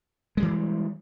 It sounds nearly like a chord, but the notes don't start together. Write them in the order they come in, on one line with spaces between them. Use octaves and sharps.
G#3 G3 E3